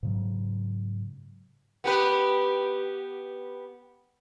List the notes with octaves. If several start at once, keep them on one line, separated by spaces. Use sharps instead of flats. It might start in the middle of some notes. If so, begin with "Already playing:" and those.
G#2 C#3 F#3
B3 G4 B4